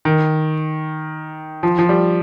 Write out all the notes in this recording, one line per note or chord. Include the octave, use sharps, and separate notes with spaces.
D#3
F3
F3
G3